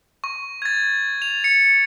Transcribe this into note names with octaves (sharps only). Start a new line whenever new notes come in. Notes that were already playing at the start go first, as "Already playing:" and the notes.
C#6
G#6 A6
F7
C#7